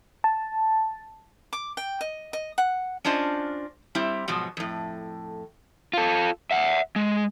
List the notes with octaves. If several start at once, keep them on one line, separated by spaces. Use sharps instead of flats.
A5
D6
G5
D#5
D#5
F#5
C#4 D4 F4 C5 D#5
G3 C4 E4 G4
G#2 B2 F3 F#3
F2 A2
F4 A4
E5 F#5
G#3